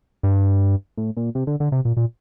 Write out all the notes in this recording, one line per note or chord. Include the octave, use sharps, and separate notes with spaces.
G2
A2
A#2
C3
D3
D3
C3
A#2
A#2